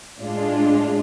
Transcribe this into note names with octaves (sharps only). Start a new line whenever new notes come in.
A2 G#3 D4 F4